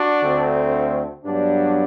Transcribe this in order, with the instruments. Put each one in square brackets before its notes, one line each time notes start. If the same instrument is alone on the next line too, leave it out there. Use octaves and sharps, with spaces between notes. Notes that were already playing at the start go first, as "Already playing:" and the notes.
Already playing: [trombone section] D4 F#4
D2 D3 A3 C4
G2 F#3 B3 D4